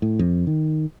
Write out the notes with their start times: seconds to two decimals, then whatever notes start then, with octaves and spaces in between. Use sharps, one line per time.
0.02 A2
0.19 F2
0.47 D#3